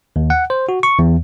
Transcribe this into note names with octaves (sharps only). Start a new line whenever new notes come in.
D#2
F#5
C5
F#4
C#6
E2